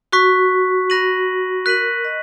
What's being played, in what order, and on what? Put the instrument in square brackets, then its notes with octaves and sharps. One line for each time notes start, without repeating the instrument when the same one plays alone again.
[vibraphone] F#4 [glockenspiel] C#6 F#6 B6
[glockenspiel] B5 F#6 A#6 D#7 F#7
[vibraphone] A#4 [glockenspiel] F#6 B6 D#7 F#7
[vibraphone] D#5